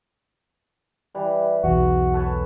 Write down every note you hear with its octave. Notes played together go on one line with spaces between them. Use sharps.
E3 G3
B1 E2 F#4
A4 B4 C#5